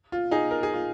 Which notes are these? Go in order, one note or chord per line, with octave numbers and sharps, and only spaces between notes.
F4
D#4 G#4
A#4
G#4
F4